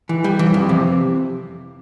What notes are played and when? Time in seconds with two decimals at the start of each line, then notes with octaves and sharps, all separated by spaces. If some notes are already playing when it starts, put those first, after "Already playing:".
0.09 E3
0.24 G3
0.39 E3
0.54 F2
0.69 C3